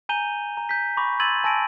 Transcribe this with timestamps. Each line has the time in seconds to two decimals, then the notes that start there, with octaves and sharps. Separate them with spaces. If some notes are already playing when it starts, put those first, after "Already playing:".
0.09 G#5 A#5 G6 D#7 F7 G7
0.57 A#5
0.69 G6 B6
0.97 B5 C#6 D6 A#6
1.20 C6 E6 G#6 A6 D#7 F#7
1.44 G#5 A5 E6 A#6 D7 D#7